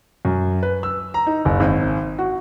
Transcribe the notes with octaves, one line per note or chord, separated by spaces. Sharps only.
F#2
B4
E6
A#5
D#4
F#1
G#1
F#4